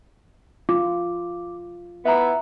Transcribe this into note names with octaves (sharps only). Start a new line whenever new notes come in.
F4 D6
B3 E4 E5 A#5